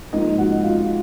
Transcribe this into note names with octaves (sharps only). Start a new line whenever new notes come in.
G#2 F3 A#3 D#4 D#5
F#4 F#5
D#5
F4 F5